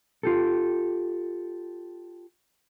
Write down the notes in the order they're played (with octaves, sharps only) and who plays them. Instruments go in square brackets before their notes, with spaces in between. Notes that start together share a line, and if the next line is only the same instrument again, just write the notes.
[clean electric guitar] F4 G4 A4